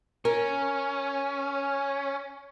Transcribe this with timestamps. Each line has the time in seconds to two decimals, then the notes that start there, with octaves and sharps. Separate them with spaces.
0.25 C#4 A#4